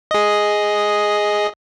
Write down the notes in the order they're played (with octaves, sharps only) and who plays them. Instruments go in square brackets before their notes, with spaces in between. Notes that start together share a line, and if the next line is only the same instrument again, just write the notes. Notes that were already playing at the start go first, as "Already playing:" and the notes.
[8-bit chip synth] G#4 D#5